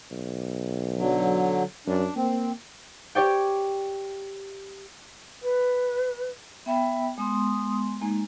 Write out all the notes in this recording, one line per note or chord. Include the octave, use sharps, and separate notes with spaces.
B1
D3 F#3
F#2 D4
A#3 C4
G4 C#5 D5 G5
B4
B3 E5 G5 B5
G#3 B3 C6 D#6
G#3 A#3 D#4 G#5